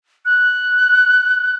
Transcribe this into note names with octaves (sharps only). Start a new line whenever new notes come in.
F#6